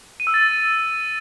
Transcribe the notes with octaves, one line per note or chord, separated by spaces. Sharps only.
D#7
E6
A6